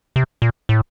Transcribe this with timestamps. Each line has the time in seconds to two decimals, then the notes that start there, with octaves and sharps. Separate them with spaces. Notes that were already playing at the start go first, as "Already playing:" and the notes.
0.16 C3
0.42 A#2
0.69 A2